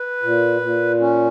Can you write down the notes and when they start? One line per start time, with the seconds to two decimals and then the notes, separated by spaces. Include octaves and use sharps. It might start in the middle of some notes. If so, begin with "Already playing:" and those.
Already playing: B4
0.23 A#2
0.61 A#2
1.00 C#4